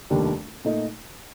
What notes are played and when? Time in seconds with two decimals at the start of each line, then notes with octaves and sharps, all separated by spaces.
0.10 F1 D#2 D#3 G3 D4
0.65 A#2 A3 D#4